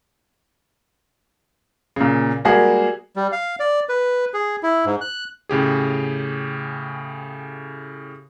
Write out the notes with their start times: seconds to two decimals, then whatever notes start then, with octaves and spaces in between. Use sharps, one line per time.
1.96 A#2 C#3
2.45 G3 G#3 A#3 F#4 G#4
3.16 G3
3.32 F5
3.60 D5
3.89 B4
4.34 G#4
4.63 E4
4.85 G#2
5.01 F#6
5.49 A2 C#3 G4 G#4